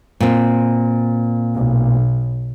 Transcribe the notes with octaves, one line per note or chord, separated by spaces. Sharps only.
A#2 C4
B1